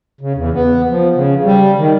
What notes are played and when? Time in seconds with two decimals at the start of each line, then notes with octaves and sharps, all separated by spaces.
0.21 C#3
0.35 E2
0.54 B3
0.89 F3
1.16 C#3
1.44 G3
1.78 D#3